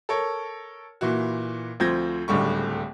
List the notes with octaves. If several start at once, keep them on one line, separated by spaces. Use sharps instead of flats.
A4 A#4 C#5
A#2 E3 E4 F#4
D2 F3 C4 G6 G#6 A#6
D1 C#2 D3 G3 C#6